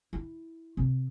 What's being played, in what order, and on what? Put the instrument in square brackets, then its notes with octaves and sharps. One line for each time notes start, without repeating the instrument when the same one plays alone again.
[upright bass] E4
C3